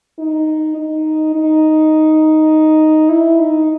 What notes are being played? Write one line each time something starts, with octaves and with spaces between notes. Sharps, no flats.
D#4
D#4
D#4
E4
D#4